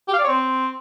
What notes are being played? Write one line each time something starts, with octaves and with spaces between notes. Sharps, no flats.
G4
F5
D5
C#5
C4